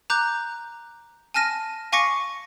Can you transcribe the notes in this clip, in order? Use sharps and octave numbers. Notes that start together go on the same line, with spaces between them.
A#5 D6 F#6 G6
G#5 A5 F6 A#6 D#7
F5 G#5 C#6 D6 A#6 C#7